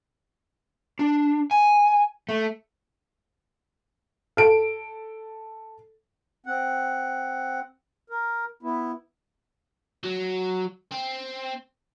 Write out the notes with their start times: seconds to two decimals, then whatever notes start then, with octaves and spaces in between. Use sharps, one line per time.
0.99 D4
1.51 G#5
2.29 A3
4.37 A4 D7
6.46 C4 F#5
8.10 A#4
8.63 B3 E4
10.03 F#3
10.91 C4